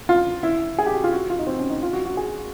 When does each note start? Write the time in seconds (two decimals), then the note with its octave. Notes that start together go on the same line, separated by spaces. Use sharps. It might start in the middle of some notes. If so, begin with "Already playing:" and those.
0.09 F4
0.43 E4
0.79 G#4
0.86 G4
0.95 F#4
1.04 F4
1.13 F#4
1.30 F4
1.39 D#4
1.47 C4
1.59 C#4
1.70 D#4
1.83 F4
1.93 F#4
2.05 F#4
2.17 G#4